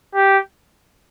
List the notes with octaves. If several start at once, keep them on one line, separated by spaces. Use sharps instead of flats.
G4